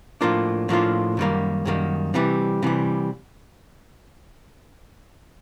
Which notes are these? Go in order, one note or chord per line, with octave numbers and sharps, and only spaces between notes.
A2 F3 A#3 D4 F4
A2 F3 A#3 D4 F4
F#2 D#3 G3 A#3
F#2 D#3 G3 A#3
C3 E3 G3
C3 E3 G3